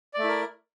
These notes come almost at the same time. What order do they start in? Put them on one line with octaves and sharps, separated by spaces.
D5 A3 E4 A#4